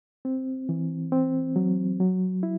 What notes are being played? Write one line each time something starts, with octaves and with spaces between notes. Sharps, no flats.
C4
E3
C4
F#3
F#3
E4